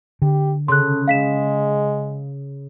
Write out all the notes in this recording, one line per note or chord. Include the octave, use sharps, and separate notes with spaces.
D3 G4
C#3 A4 C6 F#6
G#3 F5 B6 E7